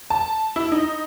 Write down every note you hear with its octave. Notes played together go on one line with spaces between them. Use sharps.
A5
E4
D#4